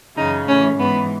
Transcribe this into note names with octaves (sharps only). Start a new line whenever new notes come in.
F#2 C#3 E3 D#4
A2 E3 C#4
G#2 E3 B3